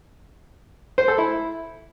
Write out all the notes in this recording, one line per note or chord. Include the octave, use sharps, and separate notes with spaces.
C5
A4
E4